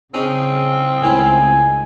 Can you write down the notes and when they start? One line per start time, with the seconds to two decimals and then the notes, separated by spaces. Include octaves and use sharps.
0.14 C#3 C4 C#4 D#4 G#4
1.03 C#2 A2 D#3 E4 G#5